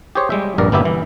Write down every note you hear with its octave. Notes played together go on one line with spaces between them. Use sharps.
G4 G#4 C5 C#5
G3 G#3 E5
A#1 G2 A#4 D5
G1 A#3 B3 E4 G4 E5
E3